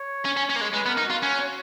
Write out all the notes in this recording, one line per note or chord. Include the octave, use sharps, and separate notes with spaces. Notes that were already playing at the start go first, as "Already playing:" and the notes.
Already playing: C#5
C#4
C#4
C#4
A#3
G#3
G#3 B4
B3
A#4
D#4
F4 F#4
C#4 F#4